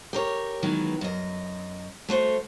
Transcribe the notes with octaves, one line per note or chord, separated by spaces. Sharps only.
G4 A#4 C#5
D#3 E3 F#3 G#3 B3
F#2 D#5
A3 F#4 C5 C#5